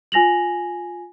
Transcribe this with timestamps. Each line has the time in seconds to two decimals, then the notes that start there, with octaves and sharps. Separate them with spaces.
0.12 F4 G#5 A#6 F7 F#7